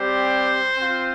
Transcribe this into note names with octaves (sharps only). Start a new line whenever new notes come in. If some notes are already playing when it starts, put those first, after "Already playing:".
Already playing: G3 C4 G4 C5
C4 F4